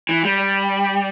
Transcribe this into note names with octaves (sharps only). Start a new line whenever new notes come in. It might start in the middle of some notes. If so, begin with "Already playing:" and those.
E3
G3